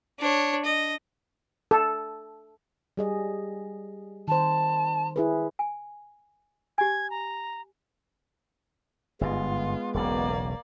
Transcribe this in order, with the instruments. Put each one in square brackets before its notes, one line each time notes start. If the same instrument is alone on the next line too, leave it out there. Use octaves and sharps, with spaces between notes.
[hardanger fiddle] D4 C#5
D#5
[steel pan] A4
[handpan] G3 G#4 D#5
[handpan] D#3 C5 [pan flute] A5
[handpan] E4 G#4 B4
[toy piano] G#5
[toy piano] G4 G#5 [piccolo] G#6
[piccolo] A#5
[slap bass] G1 G#2 [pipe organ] G#3 B3 [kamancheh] F4
[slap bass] E1 B1 C#3 [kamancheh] A#3 D5